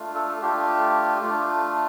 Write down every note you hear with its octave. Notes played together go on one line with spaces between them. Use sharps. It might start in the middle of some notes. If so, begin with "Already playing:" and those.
Already playing: A3 D4 F4
A4
A3 D4 F4 G4
A3 D4 F4